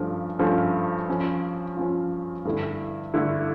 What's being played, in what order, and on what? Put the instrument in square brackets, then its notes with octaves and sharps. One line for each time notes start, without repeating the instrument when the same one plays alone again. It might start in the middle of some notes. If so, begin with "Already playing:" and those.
Already playing: [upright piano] G2 F3 A3 C#4
G2 F3 A3 C#4
F3 C#4 F4
F3 C#4 F4
G2 D3 A3 E4
G2 D3 A3 E4